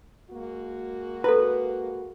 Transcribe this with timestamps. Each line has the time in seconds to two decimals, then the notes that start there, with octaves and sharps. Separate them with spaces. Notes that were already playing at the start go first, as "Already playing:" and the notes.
0.30 G#3 A#3 F#4
1.24 E4 A4 B4